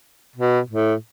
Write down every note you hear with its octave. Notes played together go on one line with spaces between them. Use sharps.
B2
A2